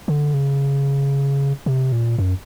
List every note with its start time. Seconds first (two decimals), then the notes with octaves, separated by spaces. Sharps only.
0.08 D3
0.34 C#3
1.66 C3
1.92 A#2
2.19 F#2